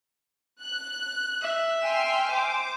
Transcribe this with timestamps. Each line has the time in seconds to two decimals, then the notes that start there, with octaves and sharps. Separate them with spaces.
0.62 F#6
1.42 E5
1.82 G5 G#5 C6 F6
2.31 C5 D6